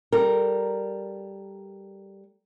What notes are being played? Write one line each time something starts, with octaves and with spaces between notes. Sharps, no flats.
G3 A4 A#4